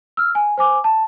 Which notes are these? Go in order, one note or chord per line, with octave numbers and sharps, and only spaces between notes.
E6 F6
G#5
C5 G#5 D6
A5